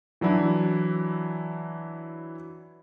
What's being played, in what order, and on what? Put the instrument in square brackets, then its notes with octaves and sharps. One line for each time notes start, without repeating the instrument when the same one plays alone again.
[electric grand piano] E3 F#3 D4 E4